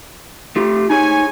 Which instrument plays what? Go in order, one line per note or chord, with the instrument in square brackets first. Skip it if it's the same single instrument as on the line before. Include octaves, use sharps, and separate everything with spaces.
[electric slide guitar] A3 F4 G4
[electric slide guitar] D#4 G#4 [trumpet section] C#5 G#5